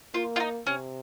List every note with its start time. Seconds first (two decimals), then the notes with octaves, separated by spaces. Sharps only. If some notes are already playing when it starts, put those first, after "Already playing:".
0.14 A#3 F4
0.36 F4
0.40 D#4
0.67 C3 C#4